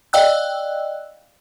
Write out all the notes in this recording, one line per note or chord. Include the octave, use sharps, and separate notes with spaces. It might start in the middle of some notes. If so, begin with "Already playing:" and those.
D5 D#5 F5 G5 E6 F#6